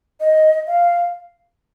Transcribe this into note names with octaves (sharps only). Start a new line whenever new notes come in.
D#5
F5